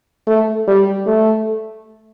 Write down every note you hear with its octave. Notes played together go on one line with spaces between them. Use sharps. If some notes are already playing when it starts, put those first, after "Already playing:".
A3
G3
A3